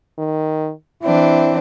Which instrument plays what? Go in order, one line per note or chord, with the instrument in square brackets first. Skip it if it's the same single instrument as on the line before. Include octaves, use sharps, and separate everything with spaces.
[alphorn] D#3
[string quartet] E3 C4 D4 [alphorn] E4